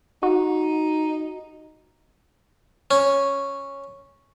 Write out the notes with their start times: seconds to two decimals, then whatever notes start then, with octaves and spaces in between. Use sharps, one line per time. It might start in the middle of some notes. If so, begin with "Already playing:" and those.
0.23 D#4 F#4
2.91 C#4